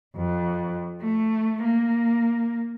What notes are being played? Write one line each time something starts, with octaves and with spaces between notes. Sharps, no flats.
F2
A3
A#3